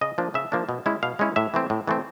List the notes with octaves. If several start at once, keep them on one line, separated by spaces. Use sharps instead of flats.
C#3 D#5
F3 A#3 D4
C#3 E5
F3 A#3 D4
B2
G#3 C#4 E4
B2 F5
G#3 C#4 E4
A2 E5
E3 A3 C4
A2
E3 A3 C4